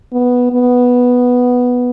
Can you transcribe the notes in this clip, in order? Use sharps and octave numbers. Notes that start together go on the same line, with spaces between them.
B3
B3